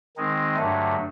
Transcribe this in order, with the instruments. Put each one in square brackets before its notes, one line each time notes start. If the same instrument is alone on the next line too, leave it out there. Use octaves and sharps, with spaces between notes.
[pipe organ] D#3 G#3 C4 D#4
G2 D3 F#3 A3